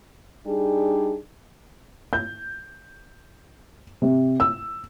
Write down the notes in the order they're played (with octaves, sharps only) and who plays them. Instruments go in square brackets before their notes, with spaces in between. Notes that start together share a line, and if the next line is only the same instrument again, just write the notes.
[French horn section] G3 D4 D#4 G#4
[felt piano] G6
C3
E6